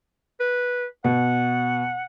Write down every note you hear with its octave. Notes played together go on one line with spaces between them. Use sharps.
B4
B2 F#5